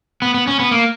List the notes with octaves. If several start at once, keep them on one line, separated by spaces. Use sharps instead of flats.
B3
B3
C#4
B3
A#3